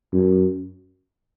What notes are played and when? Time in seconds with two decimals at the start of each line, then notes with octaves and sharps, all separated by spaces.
0.13 F#2